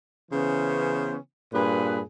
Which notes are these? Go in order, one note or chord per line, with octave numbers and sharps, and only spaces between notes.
C#3 E3 B3 C#4 C5
G2 A#2 G#4 B4